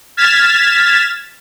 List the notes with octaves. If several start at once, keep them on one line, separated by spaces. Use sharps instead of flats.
F6 G#6 A6 B6 E7